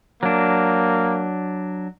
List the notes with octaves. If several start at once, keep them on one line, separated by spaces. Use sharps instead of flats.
F#3 A#3 D4